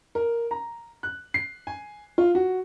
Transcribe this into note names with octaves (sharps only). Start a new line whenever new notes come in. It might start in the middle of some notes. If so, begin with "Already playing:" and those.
A#4
A#5
F#6
C7
G#5
F4
F#4